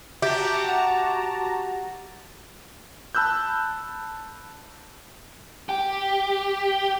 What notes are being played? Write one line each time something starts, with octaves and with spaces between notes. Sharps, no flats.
F#4 G4 E5 A5 A#5
F#5
A5 B5 E6 F#6 G6
G4